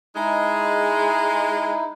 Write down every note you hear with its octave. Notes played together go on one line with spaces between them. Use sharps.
G#3 D#4 E4